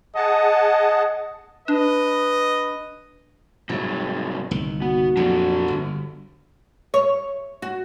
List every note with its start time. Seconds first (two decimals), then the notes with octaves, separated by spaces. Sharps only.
0.16 G#4 D#5 F#5 A5
1.68 D4 B4 D#5
3.69 G#2 C3 F#3 G3
4.51 G1 C2 D#3
4.82 B3 F#4
5.17 F2 A#2 F#3 D4 G4 A4
5.68 G1
6.94 C#5
7.62 F#4